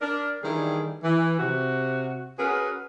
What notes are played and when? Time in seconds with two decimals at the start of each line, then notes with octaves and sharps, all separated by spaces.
0.02 D4 A#4
0.43 D#3 E3 G3 A3 D4 G#4
1.04 E3
1.39 C3 F#4
2.38 C#4 F#4 G#4 A#4 B4